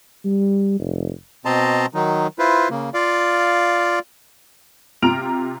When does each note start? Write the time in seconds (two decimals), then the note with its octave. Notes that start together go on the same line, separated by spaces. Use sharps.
0.25 G3
0.79 F1
1.45 B2 C4 D#5 A5 A#5 C6
1.94 D#3 F#3 D#4
2.39 E4 F4 B4 C5
2.70 C#3 A#3
2.94 F4 D5 F5
5.02 C3 F4 A#5 F6 D7 F7